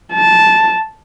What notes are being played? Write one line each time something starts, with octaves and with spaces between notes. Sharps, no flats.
A5